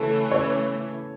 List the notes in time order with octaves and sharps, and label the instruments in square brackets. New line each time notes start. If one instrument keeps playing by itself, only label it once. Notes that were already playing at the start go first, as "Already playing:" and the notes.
Already playing: [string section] C#3 E3 A3 C#4 [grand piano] A4
[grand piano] C#5